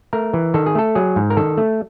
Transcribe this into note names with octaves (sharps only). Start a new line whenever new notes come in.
A3 A#4
E3
D#3 A4
G#4
A3 A4
F#3 G#4
G#2
A#4
D#3 A4
A3